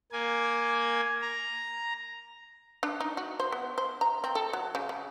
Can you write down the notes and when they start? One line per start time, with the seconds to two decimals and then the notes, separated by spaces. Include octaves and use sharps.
0.12 A#3 G#5
1.21 A#5
2.83 D4
3.00 D#4
3.17 F#4
3.40 C5
3.52 B3
3.78 C5
4.01 A#5
4.24 C4
4.35 A4
4.53 F#3
4.75 C#3
4.89 C#3